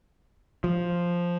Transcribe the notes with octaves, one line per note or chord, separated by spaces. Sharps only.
F3